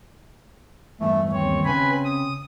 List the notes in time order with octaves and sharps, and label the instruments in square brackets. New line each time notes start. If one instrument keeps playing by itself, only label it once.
[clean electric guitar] E2 G2 [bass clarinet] A3
[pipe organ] D#2 C#5 [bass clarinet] C4
[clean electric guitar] C#3 [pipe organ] B4 G#5 B5
[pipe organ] D#6